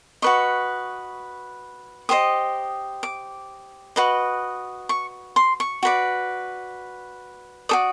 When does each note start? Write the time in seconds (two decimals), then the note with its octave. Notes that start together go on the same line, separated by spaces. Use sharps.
0.22 F#4 B4 D#5 C#6
2.09 G4 C5 D#5 D#6
3.03 D6
3.96 F#4 B4 D#5
4.89 C#6
5.36 C6
5.60 C#6
5.83 F#4 B4 D5
7.69 F#4 A4 D5 D#6